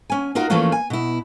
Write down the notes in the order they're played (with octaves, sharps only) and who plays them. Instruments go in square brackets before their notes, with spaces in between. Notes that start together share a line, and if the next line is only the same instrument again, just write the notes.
[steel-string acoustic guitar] C#4 G#5
D#4 F4 F#4 A#4
E3 F3 A3 A#3 C#4 F4
G#5
B2 E4